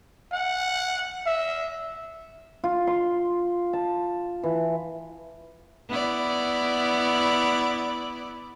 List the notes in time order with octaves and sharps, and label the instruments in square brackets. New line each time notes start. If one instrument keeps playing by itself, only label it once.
[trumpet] F#5
E5
[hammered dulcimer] F4
C6
A5
E3
[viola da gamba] B3 E4 D5